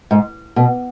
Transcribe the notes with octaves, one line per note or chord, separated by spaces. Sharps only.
G#2
B2